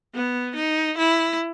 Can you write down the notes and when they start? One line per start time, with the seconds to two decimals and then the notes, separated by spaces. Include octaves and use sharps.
0.14 B3
0.56 D#4
0.98 E4